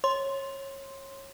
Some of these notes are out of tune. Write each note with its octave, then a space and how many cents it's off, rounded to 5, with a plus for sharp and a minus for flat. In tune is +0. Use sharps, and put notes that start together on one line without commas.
C#5 -20 C6 +0